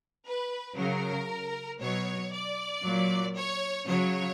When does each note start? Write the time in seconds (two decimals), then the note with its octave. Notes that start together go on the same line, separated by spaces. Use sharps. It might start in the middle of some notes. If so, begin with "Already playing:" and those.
0.26 B4
0.77 C#3 F#3 A#4
1.81 B2 F#3 C#5
2.32 D5
2.84 A#2 F#3
3.35 C#5
3.87 C#3 F#3 C#5